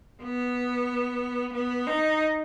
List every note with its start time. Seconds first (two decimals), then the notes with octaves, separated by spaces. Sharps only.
0.23 B3
1.54 B3
1.87 D#4